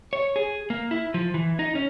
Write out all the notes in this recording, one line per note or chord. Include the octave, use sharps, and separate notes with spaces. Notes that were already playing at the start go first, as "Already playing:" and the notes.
C#5
G#4
A#3
E4
F3
E3
D#4
C#4